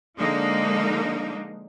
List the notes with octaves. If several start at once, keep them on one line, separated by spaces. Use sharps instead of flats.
D3 F3 G#3 A#3 D4 D#4